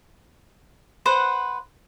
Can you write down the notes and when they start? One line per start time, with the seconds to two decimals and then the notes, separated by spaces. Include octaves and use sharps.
1.05 B4 C5 F#5